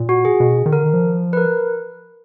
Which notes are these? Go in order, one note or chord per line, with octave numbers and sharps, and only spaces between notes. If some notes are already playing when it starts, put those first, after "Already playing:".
Already playing: A#2
F#4
G#4
B2
D#3
D3 A#4
D#3
F3
B4
A#4